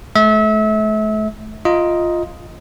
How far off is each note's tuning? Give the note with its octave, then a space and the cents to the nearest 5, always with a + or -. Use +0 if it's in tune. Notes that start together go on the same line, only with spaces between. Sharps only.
A3 -35 E5 -30
F4 +0 D#5 +10 A#5 +20